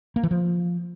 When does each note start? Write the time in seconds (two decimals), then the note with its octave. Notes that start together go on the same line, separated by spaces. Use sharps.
0.16 A#3
0.23 E3
0.31 F3